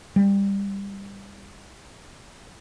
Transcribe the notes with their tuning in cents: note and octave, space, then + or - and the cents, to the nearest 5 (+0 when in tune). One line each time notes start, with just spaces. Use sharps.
G3 +20